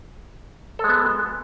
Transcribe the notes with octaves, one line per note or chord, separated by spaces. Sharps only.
G#3 B3 A4